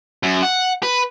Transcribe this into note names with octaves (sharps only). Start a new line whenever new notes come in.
F#2
F#5
B4